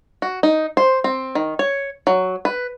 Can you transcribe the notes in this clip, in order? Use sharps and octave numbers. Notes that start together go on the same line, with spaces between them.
F#4
D#4
C5
C4
D#3
C#5
F#3
B4